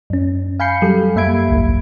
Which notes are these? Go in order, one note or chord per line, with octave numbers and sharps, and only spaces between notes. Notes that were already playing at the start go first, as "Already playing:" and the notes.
F#2 C#4
F5 G#5 B5 G6 C7 C#7
F#3 G3 G4 A4
F#2 A#3 E5 B5 G#6 D7
G#1 C#2